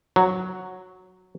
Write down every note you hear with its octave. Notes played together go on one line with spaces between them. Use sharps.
F#3